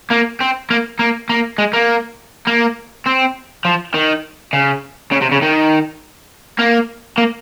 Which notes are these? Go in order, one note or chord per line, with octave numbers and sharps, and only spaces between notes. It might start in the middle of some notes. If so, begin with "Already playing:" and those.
A#3
C4
A#3
A#3
A#3
G#3
A#3
A#3
C4
F3
D#3
C#3
C#3
C3
C#3
D#3
A#3
A#3